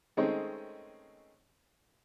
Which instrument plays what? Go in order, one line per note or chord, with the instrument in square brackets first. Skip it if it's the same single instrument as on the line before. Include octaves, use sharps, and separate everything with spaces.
[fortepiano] D#3 G#3 A3 C4 C#4 D#4